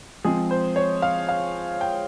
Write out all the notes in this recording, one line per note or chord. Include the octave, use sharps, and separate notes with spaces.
F3 G#3 C4 G#4
C5
C#5
F5
F5
G5